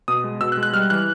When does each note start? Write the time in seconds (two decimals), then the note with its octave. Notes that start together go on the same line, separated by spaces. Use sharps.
0.08 B2 D#6
0.24 G#3
0.41 B2 E6
0.52 F#6
0.57 G#3
0.63 F#6
0.73 G3 F6
0.90 E3 F#6